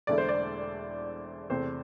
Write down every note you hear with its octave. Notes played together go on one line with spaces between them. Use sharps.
E1 E2 D3 A3 E4 D5
C5
D5
E2 C3 A3 C4 C5